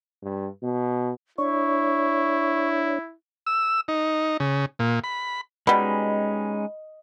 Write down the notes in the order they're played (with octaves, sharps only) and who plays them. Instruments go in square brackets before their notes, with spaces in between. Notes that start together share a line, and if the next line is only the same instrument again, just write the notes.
[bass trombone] G2
B2
[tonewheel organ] D4 C#5 [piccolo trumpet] E4 [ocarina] C#6
[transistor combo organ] E6
D#4
C#3
A#2
B5
[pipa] B2 G3 [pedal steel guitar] G#3 C#4 D#4 [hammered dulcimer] D#5 [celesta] B5